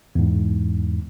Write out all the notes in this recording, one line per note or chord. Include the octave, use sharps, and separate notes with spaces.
E2 G#2